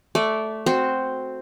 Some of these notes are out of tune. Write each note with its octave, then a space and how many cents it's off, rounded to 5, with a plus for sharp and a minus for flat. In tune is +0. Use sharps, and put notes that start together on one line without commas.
A3 -5 D5 -15
C4 +0 F#4 +0 C5 +0